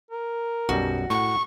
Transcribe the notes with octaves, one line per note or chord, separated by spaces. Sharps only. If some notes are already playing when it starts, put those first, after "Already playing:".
A#4
B1 F#2 G3 F#4
A2 F#5 C#6